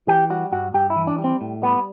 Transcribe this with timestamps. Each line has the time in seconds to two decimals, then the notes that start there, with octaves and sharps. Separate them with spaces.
0.08 E3 G4
0.30 G3 F#4
0.52 G2 F#4
0.74 G2 G4
0.90 E4
0.96 E3
1.07 D4
1.18 G3
1.24 C4
1.41 A2
1.62 G3 B3